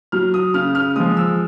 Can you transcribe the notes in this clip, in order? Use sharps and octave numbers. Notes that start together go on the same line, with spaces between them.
F#3 F6
D#6
C#3 F6
F6
F3 G#3 D#6
E6